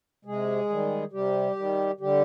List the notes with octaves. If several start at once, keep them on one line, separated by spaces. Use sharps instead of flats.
C3 G#3 G#4
D#3 G3
C3 G3 G4
D#3 G3
D3 G3 G4